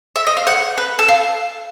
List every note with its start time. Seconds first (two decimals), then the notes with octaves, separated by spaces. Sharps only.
0.16 E5
0.27 D#5
0.37 F5
0.47 F#5
0.78 B4
0.99 A4
1.08 F4